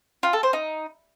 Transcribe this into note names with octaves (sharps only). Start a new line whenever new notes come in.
F4
A4
C5
D#4